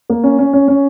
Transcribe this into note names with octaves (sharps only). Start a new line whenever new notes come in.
A#3
C#4
C#4
C#4
C#4